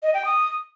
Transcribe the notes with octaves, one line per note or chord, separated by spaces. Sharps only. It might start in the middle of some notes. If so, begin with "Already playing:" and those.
D#5
G5
D#6